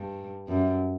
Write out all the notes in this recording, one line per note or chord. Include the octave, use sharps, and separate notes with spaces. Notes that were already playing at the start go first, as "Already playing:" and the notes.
Already playing: G2
F#2